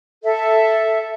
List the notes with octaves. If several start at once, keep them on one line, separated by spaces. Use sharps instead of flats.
A4 E5